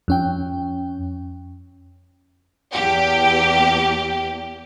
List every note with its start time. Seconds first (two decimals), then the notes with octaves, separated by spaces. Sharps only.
0.08 F2 C#4 G5
2.73 E2 G4